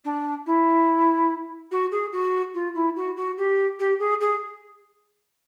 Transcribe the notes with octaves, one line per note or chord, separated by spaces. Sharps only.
D4
E4
F#4
G#4
F#4
F4
E4
F#4
F#4
G4
G4
G#4
G#4